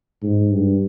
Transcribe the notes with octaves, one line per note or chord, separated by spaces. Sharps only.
G#2
G2